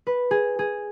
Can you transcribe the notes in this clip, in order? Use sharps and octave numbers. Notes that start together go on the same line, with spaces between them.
B4
G#4
G#4